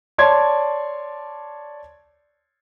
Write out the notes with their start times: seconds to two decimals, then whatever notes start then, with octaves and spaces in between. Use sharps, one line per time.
0.18 C#5 D5 A5 C6 G#6